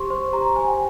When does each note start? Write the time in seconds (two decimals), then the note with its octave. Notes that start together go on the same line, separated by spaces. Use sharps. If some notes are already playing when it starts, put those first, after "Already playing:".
Already playing: G4 C5 C6 C#6
0.10 C5 C6
0.33 G4 A#5
0.56 C5 G#5
0.68 G5